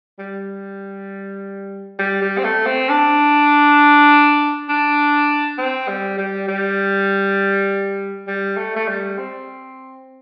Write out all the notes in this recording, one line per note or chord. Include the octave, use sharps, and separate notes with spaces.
G3
G3
G3
C4
A3
C4
D4
D4
C4
G3
G3
G3
G3
A3
A3
G3
C4